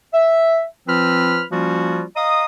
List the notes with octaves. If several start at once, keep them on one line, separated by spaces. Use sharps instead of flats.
E5
F3 C4 F4 B4 B5 F6
F3 G3 A#3 C#4 F4 F#4
D#5 F5 A#5 D#6